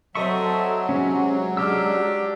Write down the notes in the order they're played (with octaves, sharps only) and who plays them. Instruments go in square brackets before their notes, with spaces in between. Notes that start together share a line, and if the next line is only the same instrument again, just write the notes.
[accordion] F#3 [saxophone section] C4 D#5 E5 [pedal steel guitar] A4 C#6
[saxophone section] C3 [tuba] G#3 [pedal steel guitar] C#4
[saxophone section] D4 G4 [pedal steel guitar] E6 F6